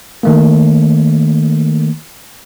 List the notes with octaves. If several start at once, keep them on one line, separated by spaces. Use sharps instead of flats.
D#3 A3 A#3